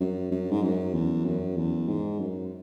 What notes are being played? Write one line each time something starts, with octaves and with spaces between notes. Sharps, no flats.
F#2
F#2
G#2
F#2
E2
F#2
E2
G#2
F#2